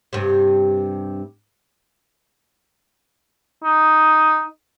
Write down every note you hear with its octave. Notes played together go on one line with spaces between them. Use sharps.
G2 C3
D#4